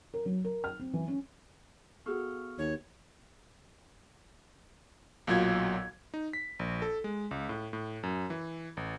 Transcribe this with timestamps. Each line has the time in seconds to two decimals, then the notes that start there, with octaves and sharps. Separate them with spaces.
0.14 A#4
0.26 F#3
0.45 A#4
0.64 F6
0.80 C4
0.94 E3
1.08 C#4
2.06 B3 F#4 G#4 A4 C#6 F6
2.58 D#2 C#5
5.27 B1 A#2 F#3 F4 G#6
6.14 D#4
6.33 B6
6.59 A#1
6.82 A4
7.04 G#3
7.31 C#2
7.49 A2
7.73 A2
8.03 F#2
8.30 E3
8.77 A1